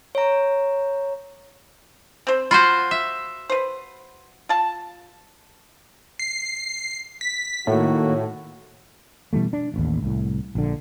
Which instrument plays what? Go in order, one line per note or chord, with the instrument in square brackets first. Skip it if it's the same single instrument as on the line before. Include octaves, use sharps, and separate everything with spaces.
[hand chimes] C#5 A#5
[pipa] C4 C5
[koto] F4 F#4 C5 [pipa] B5
[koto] E5
[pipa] B4 C5
F4 A5
[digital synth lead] C7
B6
[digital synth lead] A2 [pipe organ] D#3 A#3 F#4
[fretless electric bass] B2 E3 G3 A3
D4
D#1 A1 D#2
C2 A2
A#1 D3